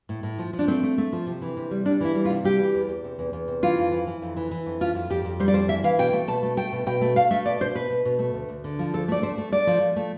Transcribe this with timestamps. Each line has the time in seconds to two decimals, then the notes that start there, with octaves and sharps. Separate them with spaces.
0.09 A2
0.23 A2
0.38 F3
0.53 F3
0.59 D4
0.68 A3 C4
0.83 A3
0.98 A3
1.13 F3
1.27 C3
1.42 E3
1.57 C3
1.71 G3
1.85 G3 D4
2.01 E3 E4
2.15 G3
2.25 F4
2.30 C3
2.44 G3 G4
2.59 E3
2.74 E2
2.89 E2
3.04 C3
3.19 E2
3.33 E2
3.48 C3
3.63 E3 F4
3.78 F2
3.91 E3
4.07 E3
4.22 F2
4.36 E3
4.51 E3
4.66 F2
4.81 F2 F4
4.95 F2
5.10 F2 G4
5.25 F2
5.40 G3 C5
5.48 D5
5.54 F2 C5
5.68 E3 E5
5.84 E3 F5
5.99 B2 G5
6.13 A3
6.28 B2 A5
6.43 A3
6.57 A3 G5
6.72 B2
6.86 B2 G5
7.01 A3
7.16 A3 F5
7.31 A3 E5
7.45 B2 D5
7.60 B2 C5
7.75 B2 B4
7.90 B2
8.05 B2
8.19 A3
8.34 D2
8.49 D2
8.64 D3
8.79 F3
8.93 D2 A4
9.08 A3 D5
9.22 A3 C5
9.38 A3
9.52 A3 D5
9.67 F3
9.81 F3
9.96 A3